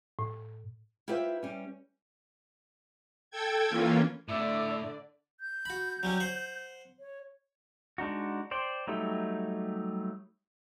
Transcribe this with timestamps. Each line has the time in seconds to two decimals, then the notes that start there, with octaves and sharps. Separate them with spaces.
0.19 A2
1.08 E4 F4 G4 B4 C5 E5
1.43 G3 C#4
3.30 A4 G5 G#6
3.69 E3 A#3 C#4 F4
4.29 A2 D3 D5 E5
5.40 G6
5.65 F#4 B5
6.03 F#3 G3 C#4
6.20 C5 F#5
7.00 C#5
7.98 G#3 D4 D#4 F#4
8.51 C5 D5 G5
8.87 F#3 G3 A3 D#4 G4